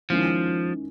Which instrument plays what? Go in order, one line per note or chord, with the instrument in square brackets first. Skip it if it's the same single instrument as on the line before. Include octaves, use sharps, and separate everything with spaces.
[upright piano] D#3 G#3 C#4 E4 [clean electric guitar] F3